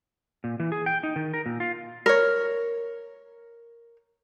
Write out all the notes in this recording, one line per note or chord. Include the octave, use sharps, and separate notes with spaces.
A#2
E3
G#4
G5
D#4
D#3
A#4
A#2
F4
A#4 C#5